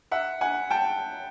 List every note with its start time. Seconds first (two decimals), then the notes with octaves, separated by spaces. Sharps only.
0.11 E5 F#5
0.41 F#5 G#5
0.70 G5 A5